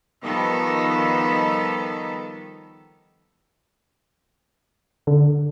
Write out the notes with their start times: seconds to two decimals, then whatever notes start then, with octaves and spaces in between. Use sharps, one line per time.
0.21 D#3 F3 G3 B3 A4 A#4
5.07 D3